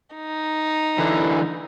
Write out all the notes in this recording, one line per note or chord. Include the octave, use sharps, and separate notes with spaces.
D#4
D3 E3